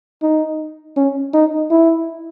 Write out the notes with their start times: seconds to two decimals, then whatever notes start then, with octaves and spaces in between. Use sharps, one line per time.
0.22 D#4
0.97 C#4
1.34 D#4
1.71 E4